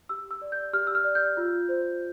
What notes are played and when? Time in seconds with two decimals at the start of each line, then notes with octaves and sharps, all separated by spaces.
0.09 G4 E6
0.31 E6
0.42 D5
0.52 G6
0.73 G4 F6
0.87 E6
0.95 F6
1.04 D5
1.15 G6
1.37 F4
1.69 C5